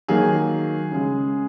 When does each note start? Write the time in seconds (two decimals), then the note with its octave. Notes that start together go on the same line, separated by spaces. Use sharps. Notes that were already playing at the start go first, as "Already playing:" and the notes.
0.08 D#3 F#3 A#3 G#4
0.91 C#3 G#3